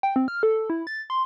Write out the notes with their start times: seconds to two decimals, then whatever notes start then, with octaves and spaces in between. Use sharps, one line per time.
0.03 G5
0.16 C4
0.28 F6
0.43 A4
0.70 E4
0.87 A6
1.10 C6